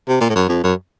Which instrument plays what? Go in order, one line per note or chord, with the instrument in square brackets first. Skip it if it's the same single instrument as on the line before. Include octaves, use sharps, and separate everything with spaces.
[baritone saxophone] C3
A#2
A2
F#2
F2
F#2